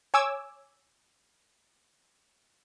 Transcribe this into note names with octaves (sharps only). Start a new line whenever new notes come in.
C#5 G#5 D6 E6 G#6